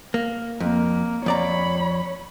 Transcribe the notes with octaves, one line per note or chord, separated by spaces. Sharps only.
A#3
F2 A#3
F2 C#5 D5 A#5 B5